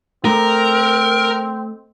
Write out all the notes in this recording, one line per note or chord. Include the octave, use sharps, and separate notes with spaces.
A3 C4 A#4